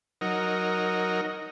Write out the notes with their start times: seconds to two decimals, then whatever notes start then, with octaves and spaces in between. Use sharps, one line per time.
0.21 F#3 D#4 A#4